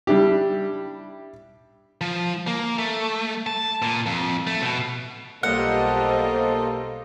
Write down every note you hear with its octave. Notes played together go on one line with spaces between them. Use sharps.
G3 D4 E4 G4
F3
A#3
A3
A5
A#2
F2
A3
B2
B1 G3 A#3 F4 A4 C5 D#5 F#5